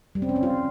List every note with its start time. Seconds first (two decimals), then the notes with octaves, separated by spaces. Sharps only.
0.15 G3
0.22 C4
0.29 C#4
0.36 C4
0.43 F4